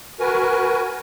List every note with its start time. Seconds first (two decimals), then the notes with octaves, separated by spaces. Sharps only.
0.20 F#4 A#4 B4 G#5